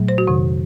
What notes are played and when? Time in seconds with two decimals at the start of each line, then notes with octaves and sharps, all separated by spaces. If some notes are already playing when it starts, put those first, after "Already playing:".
Already playing: A#2 F#3 A3
0.08 C5
0.18 F#4
0.27 F2 C3 D#3